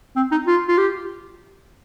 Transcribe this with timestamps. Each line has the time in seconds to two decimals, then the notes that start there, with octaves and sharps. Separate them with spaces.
0.16 C4
0.32 D#4
0.47 F4
0.69 F4
0.78 G4